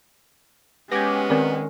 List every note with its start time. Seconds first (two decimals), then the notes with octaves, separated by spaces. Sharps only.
0.92 G#3 B3 C#4 G4 G#6 A#6
1.30 D#3 C4 A#4 D5